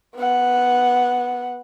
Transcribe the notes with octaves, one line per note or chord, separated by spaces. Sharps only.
B3 F#5